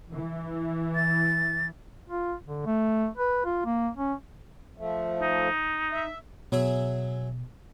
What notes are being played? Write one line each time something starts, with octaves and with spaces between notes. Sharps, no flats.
E3
A6
F4
D3
A3
B4
F4
A#3
C#4
F3 A3
D#4
E5
B2 F#3 G#4 E5